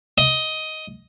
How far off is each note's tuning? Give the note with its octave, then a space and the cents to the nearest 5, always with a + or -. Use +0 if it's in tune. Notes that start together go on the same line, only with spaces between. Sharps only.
D#5 +10